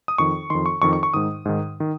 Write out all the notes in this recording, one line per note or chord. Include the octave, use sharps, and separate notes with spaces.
D#6
F2 D#3 C#6
F2 D#3 C6
C#6
F2 D#3 C#6
C#6
C#6
G#2 D#3 D#6
G#2 D#3
D#3